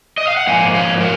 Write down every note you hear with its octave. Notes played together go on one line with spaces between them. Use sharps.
D#5
F5
F#5
G#2 F3 A#3 F4 F5 G#5
C#5 F5
A#4 C#5